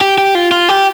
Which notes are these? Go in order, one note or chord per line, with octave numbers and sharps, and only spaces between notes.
G4
G4
F4
F4
G4